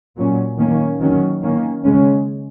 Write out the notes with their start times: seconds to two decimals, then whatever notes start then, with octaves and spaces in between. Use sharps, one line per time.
0.17 A#2 F#3 C#4
0.57 D#3 A#3 C#4
1.00 D#3 F#3 C#4
1.41 D#3 A#3 C#4
1.83 C#3 G#3 C#4